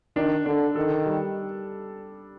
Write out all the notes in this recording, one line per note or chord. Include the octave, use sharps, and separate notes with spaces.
D#3 D4
D3 D4
D#3 A4
G3